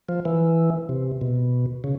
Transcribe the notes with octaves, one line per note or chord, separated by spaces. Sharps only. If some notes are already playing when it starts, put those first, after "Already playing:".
F3
E3
C3
B2
C#3